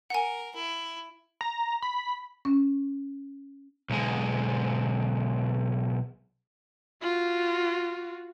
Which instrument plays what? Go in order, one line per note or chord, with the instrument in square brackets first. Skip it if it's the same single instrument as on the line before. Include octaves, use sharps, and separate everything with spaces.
[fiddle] A#4 [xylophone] F#5 G#5
[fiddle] E4
[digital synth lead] A#5
B5
[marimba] C#4
[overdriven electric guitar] B1 G#3
[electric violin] F4 F#4